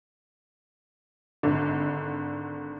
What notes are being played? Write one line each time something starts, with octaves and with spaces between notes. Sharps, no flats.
G#1 D3